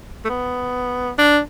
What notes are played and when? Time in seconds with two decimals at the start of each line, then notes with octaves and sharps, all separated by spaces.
0.25 A3
0.29 B3
1.18 D4